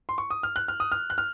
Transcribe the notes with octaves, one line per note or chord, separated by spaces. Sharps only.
C6
C#6
D#6
F6
F#6
F6
D#6
F6
F#6
F6